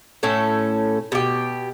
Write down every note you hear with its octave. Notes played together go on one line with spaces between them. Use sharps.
A2 C#4 A4
B2 G4